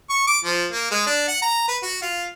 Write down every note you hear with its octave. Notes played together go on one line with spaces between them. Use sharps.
C#6
D6
F3
A#3
G#3
D4
F#5
A#5
B4
F#4
F4